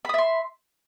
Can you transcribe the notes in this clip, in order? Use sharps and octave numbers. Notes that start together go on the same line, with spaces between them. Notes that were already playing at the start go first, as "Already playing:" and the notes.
E5 B5 C6 D#6